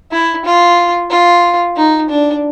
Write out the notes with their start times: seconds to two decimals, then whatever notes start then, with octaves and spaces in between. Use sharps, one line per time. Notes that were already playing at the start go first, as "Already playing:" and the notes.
0.12 E4
0.45 F4
1.10 F4
1.76 D#4
2.09 D4